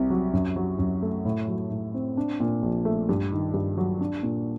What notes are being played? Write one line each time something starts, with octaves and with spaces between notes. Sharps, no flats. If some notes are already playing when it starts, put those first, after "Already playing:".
Already playing: C2 C3
F#3
F#2
F#3
F#2
A3
A2
F#3
A2
C4
D4
A#2
A#1
A3
G2
D#3
G2
F#3
D4
A#2